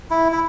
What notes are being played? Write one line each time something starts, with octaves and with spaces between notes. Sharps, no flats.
E4
E4